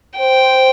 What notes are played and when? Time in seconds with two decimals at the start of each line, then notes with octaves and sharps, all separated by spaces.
0.18 C5 G5